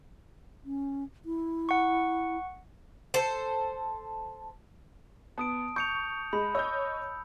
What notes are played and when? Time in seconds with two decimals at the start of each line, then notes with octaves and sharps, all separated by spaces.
0.65 C#4
1.25 E4
1.69 F#5 C#6
3.14 A4 C5
5.38 B3 A5 D#6 D7
5.76 C#6 G6 C#7 F7
6.33 G#3 B5
6.55 C#5 D#5 E6 G6